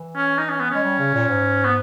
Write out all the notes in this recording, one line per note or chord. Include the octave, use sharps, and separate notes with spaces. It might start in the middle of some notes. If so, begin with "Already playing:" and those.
Already playing: E3
C#4
D#4
C#4
B3
G#3 C#4
G3
C#3
A#2
G#2
B3